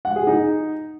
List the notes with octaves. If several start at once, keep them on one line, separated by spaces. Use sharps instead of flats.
F#5
G#4
D#4